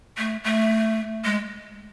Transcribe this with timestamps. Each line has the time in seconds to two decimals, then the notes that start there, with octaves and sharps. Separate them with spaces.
0.18 A3
0.44 A3
1.25 G#3